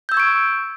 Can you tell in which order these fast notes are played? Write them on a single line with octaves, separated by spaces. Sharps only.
G6 E6 G#6 C#6 D7